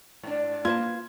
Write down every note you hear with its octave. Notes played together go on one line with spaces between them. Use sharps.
G#2 D4
A#3 F4 B4 A5 G#6